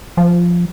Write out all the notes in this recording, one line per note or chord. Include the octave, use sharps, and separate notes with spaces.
F3